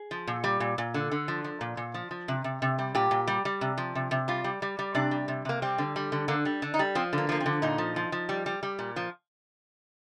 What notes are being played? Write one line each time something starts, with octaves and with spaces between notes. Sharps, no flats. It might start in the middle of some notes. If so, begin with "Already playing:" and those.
Already playing: G#4
F3
A#2
G3
A#2
A#2
D3
D3
F3
F3
A#2
A#2
F3
F3
C3
C3
C3
G3
A#2 G4
A#2
G3
G3
C3
F3
C3
C3
G3 F4
G3
G3
G3
C3 D4
G3
C3
C3 A#3
G3 C4
D3
G3
D3
D3 A#3
G3
D3
D#4
G3
F3 C4
D3
A#3
F3 A#3
C4
D3
A#2 D#4
F3
F3
F3
G3
G3
G3
A#2
F3